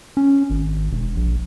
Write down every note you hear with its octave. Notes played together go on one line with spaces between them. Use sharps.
C#4
G#1
E1
A#1